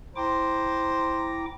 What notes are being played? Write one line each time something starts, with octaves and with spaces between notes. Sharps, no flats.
E4 C5 G5 A#5 D6